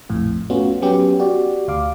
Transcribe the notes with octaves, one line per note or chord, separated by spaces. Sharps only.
A#1 F2 A2
A3 B3 C#4 F4 F#4
F#3 B3 C#4 G4
F#4 G4 D5
D2 F5 D6